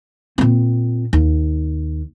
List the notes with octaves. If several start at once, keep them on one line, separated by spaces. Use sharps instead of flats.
A#2 C4
D#2